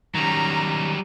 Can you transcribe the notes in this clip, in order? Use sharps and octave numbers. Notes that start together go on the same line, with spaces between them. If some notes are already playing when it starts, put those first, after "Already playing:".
D#3 F#3 G3 C#4 A#5